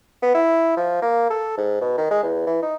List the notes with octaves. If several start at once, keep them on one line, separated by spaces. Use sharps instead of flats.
B3
E4
F3
A#3
A4
G#2
B2
D#3
G#3
E2
E3
D#4